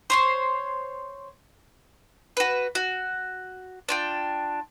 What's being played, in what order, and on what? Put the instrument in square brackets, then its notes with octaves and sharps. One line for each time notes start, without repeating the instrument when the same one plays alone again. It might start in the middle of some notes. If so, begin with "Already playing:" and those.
[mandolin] C5 C#5 C6
F#4 B4
F#4
D4 F4 G5